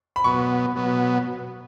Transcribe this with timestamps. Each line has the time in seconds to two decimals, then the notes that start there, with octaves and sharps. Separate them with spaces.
0.16 B5
0.24 B2 F#3 B3 C#6
0.76 B2 F#3 B3